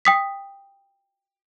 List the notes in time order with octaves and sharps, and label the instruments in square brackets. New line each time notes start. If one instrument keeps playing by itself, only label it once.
[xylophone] G5 D#6 B6